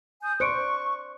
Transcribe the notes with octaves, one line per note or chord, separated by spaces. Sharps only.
G#5 D#6 G6
C5 D5 C#6 F#6 C#7 D7